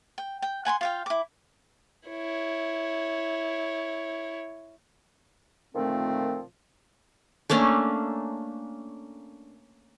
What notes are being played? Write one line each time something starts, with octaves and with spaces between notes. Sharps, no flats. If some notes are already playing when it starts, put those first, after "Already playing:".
G5
G5
F#5 G#5 B5 C6
F4 F5 G5
E4 D6
E4 C#5
A#2 D3 D#3 F3 A3 C4
A3 A#3 C#4 D4